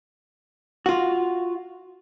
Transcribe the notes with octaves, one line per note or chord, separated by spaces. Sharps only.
F4 F#4